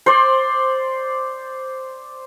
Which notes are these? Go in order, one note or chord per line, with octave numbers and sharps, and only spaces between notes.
C5 D5